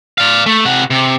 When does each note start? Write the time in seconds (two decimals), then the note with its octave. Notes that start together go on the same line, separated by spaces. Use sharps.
0.18 D5 F5
0.46 A3
0.65 C3 F#5
0.90 C3